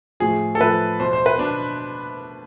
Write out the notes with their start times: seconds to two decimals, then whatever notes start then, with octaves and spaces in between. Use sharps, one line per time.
0.20 A2 F3 G#4
0.55 A4
0.60 A2 F3 B4
1.00 B2 C5
1.13 C5
1.26 B4
1.38 B2 D4